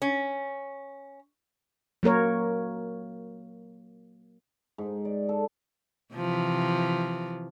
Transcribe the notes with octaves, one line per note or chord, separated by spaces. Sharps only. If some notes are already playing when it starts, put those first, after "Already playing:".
C#4
F#3 A#3 A#4 C#5
G#2
D5
A4
C3 E3 F3